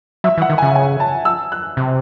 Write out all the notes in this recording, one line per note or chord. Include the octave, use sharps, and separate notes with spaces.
F#3 E5
E3
F#5
D#3
C#3 G#5
G#5
A5
E6
F#6
C3 F#6